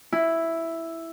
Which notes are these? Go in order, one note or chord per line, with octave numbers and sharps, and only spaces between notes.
E4